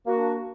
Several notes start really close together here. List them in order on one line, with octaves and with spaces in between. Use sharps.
A#3 F#4 D4